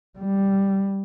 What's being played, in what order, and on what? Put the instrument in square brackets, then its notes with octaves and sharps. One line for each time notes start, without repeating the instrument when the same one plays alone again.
[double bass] G3